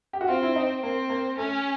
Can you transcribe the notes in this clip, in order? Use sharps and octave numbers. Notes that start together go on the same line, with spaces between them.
G4
F#4
C4 F4
E4
D#4
A#3 C4
A#3
A3 C#4